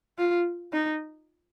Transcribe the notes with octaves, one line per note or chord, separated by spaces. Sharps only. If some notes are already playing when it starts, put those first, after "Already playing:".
F4
D#4